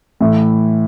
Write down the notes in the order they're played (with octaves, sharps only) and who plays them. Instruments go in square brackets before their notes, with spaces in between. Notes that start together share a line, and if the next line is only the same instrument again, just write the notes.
[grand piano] A2 E3 A3